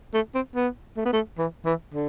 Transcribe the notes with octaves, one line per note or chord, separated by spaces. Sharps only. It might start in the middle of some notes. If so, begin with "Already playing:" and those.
A3
C4
B3
A3
B3
A3
E3
E3
D3